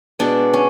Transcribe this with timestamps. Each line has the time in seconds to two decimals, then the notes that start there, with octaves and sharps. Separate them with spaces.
0.19 B2 G#3 B3 D4
0.53 C#4